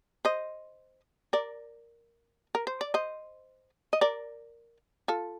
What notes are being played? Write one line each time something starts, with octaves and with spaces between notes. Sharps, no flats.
C5 D#5
A#4 D5
A#4
C5
D5
C5 D#5
D#5
A#4 D5
F4 A4